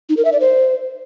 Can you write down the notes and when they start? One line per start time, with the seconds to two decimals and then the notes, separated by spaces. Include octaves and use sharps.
0.09 D#4
0.17 A#4
0.25 E5
0.32 D5
0.40 C5